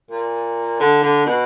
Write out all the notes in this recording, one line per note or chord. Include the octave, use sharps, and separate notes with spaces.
A#2
D3
D3
B2